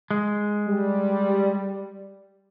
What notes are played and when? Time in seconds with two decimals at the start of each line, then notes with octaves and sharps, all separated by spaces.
0.11 G#3
0.68 G3